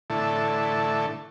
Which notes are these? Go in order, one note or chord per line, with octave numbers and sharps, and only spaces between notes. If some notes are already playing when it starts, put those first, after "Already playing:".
A2 D3 E3 A3 E4 A4